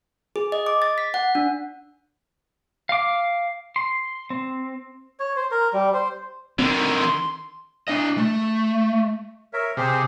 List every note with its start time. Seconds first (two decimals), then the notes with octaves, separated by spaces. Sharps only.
0.36 G#4
0.52 D#5
0.66 D6
0.82 A6
0.98 B6
1.14 F#5
1.35 D4
2.89 F5 D6
3.76 C6
4.30 C4
5.20 C#5
5.36 C5
5.51 A#4
5.73 G3
5.94 C5
6.59 D3 D#3 C4
6.97 C6
7.88 D4 D#5
8.17 A3
9.53 A#4 C#5 E5
9.77 C3 G4 G#4 C5